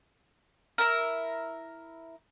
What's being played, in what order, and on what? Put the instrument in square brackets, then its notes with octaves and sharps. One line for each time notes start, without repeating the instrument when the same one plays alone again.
[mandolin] E4 A#4